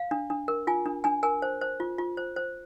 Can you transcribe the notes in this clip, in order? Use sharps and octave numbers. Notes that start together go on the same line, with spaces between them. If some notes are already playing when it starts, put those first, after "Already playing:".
Already playing: F5
D4
D4
A#4
F4 G#5
D4
D4 G#5
A#4 G#5
C5
C5
F4
F4
C5
C5